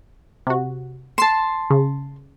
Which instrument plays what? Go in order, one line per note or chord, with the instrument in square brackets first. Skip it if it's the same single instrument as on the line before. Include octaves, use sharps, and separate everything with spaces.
[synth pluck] C3 F#4
[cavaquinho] A5 C6 [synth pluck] C7 E7
[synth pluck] C#3